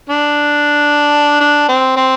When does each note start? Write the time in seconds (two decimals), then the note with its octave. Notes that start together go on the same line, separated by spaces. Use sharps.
0.10 D4
1.41 D4
1.69 C4
1.97 C4